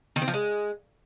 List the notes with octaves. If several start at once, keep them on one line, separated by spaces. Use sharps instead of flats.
D#3
C4
F3
G#3